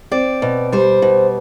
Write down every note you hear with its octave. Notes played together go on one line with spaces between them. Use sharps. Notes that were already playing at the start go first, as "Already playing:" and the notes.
C4 D5
B2
G3 C5
B2